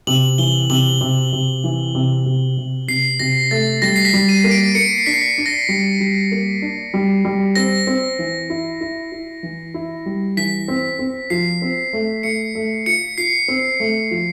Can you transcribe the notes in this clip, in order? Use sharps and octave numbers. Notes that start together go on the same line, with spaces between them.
C3 F#7
E3 G7
C3 F#7
C3
C3
E3
C3
C3
C3
C3 C7
C3 A#6
A3 A6
G3 A#6
C7
B6
G3
D#7
A#3
D7
A#3 C#7
C7
D4 B6
C7
B6
D4
A#6
G3
G3
A#3
D4
G3
G3
C4 A#6
C4
E3
E4
E4
E4
E3
E4
G3
E3 B6
C4
C4
F3 C7
C4
A3
A3 C#7
A3
F4 C#7
F4 C7
C4
A3
F3